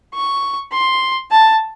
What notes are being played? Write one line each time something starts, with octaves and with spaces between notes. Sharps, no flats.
C#6
C6
A5